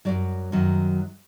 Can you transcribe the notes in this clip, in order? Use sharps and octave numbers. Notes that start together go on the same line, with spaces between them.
F#2 D#3 F#3 D5
F#2 D#3 F#3